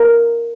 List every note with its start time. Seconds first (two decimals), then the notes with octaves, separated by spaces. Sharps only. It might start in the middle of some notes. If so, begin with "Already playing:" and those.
Already playing: A#4